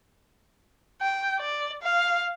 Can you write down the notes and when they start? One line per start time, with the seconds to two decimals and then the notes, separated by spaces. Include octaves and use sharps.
1.02 G5
1.40 D5
1.83 F5